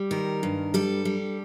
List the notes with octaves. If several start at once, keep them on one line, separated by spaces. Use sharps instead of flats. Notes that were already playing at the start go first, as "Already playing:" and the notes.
Already playing: G3
D#3 A#4
G2
G3 A4
G3